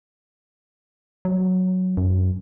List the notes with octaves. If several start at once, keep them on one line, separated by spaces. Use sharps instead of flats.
F#3
F#2